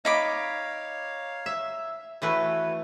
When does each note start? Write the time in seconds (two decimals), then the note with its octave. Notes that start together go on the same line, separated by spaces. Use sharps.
0.05 D#4 C#5 F5 B5 D6
1.46 E5
2.22 E3 A3 F#4 B4 C#5